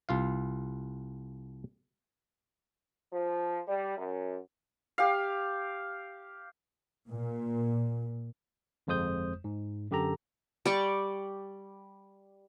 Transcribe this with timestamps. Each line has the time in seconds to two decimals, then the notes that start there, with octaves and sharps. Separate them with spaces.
0.09 C2 F4 F5
3.13 F3
3.67 G3
3.97 F#2
4.98 G4 F5
7.10 A#2
8.87 G1 F2 G#3 C5 D#6 G6
9.44 G#2
9.91 F#2 D3 G4 A4 A#5
10.66 G3 D5 C#6